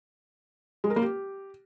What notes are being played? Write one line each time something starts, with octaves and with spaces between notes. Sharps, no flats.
G#3
A#4
A#3
G4